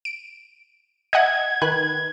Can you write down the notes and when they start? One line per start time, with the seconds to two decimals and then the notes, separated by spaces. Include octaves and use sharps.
0.05 D7
1.13 D#5 E5 F#5 G#6
1.62 D#3 B4 F#6